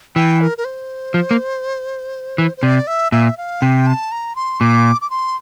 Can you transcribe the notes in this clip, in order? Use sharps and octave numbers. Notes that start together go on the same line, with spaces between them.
E3 G5
A#4
A#4
C5
F3
A#3
E3
C5
C3 D5
E5
A#2 E5
F5
C3 G5
A5
A#5
C6
A#2 D6
D6
C6